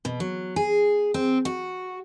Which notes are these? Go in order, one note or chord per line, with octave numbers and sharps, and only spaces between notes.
B2
F#3
G#4
C4
F#4